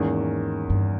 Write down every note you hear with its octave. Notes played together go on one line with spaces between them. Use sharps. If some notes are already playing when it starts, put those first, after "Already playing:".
Already playing: E2 G#2 D#3 A#3 C#4
G2